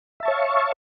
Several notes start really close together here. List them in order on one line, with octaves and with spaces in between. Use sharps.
E5 A5 C#6 C#5 F5